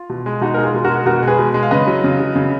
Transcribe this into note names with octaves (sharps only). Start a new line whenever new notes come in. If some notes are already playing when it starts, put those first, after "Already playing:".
Already playing: F4
B2
G#3
B2 D#4 F#4
G#3 A#4
F4 G#4
B2
F#4 A#4
G#3
B2 F#4 A#4
G#3
G#4 B4
B2
G#3
F5
C#3 B4 D#5
F#3
C#3
F#3
C#3